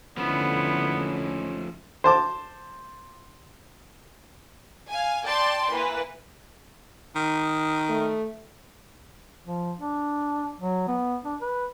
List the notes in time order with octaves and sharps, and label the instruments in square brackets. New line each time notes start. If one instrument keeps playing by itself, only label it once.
[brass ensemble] E2 G#2 C#4 [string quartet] D3 E4 [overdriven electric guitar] F3 A3 [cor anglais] B3
[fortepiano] C5 A5 D6
[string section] F5 G#5
D5 G5 A5 C6
E3 A#3 B4
[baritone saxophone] D#3
[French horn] A3
[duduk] F3
D4
F#3
B3
D4
B4